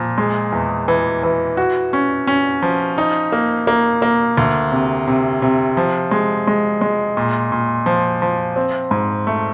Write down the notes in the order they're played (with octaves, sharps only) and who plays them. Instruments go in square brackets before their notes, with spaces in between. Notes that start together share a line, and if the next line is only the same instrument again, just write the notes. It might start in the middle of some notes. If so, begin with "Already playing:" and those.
Already playing: [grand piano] A#2 F3
G#3
E2
E3
E3
F#4
C#4
C#4
F3
D#4
A#3
A#3
A#3
D2
C3
C3
C3
F3
G#3
G#3
G#3
A#2
A#2
F3
F3
C4
G#2
A3